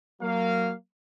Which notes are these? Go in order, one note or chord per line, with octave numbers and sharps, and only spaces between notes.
F#3 A#3 F5